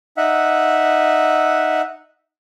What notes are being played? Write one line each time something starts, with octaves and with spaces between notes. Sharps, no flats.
D#4 E5 F#5